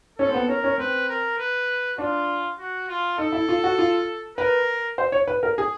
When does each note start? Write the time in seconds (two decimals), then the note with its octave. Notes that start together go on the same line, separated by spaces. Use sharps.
0.18 C#4 A4
0.29 C4
0.34 B3
0.48 C#4 A#4
0.64 C#4
0.78 C4 B4
1.09 A#4
1.38 B4
1.98 D4 F4
2.58 F#4
2.88 F4
3.18 D#4 A4
3.32 E4
3.49 F4
3.64 F#4
3.78 F4
4.37 A#4 B4
4.98 C5
5.12 C#5
5.27 B4
5.43 A#4
5.58 G#4